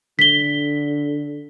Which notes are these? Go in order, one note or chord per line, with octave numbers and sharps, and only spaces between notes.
D3 B6 G7